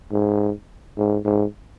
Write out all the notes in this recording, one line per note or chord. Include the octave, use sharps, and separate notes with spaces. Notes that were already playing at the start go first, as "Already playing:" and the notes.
G#2
G#2
G#2